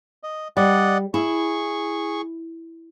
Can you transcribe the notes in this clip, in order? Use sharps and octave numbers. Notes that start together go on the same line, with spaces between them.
D#5
G3 D5 D#5 F#5
E4 G#4 C#6